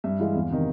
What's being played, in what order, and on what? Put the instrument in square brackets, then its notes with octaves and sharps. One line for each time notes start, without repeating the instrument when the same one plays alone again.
[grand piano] G2 E5
E3 G#3 F5
E2
C3 D#3